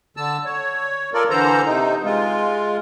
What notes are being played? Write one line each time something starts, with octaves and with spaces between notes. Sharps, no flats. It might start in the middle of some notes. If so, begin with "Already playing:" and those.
D3 A5 E6
C#5
F4 A4 A#4 D5
D3 E3 A4 C5 A#5
C3 D#4
G#3 F4